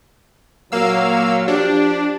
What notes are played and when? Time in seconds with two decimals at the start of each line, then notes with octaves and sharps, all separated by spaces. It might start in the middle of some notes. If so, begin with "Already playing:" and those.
0.72 A#2 F#3 A#3 F5 E6
1.48 F3 D4 G4